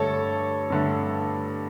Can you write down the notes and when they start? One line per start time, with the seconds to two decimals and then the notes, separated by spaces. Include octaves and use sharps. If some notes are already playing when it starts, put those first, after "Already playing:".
Already playing: G2 D3 A3 A4 C#5
0.70 G2 D3 A3